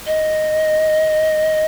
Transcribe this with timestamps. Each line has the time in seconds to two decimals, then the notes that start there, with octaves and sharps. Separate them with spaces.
0.07 D#5